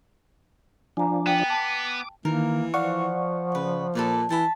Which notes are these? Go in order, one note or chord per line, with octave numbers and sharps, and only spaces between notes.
F3 D4 G#5 A#5
B3 G5
A5 D6
D#3 E3 A#3 A#4
F3 D5 F5 F#5 C#6
C#3 B4
A#2 A4 B4 D5
E3 A5 B5